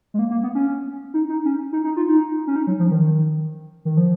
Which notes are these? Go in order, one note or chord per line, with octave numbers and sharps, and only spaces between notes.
G#3
A#3
A#3
B3
C#4
D#4
D#4
C#4
D#4
D#4
F4
D#4
C#4
D#4
F#3
F3
D#3
D#3
F3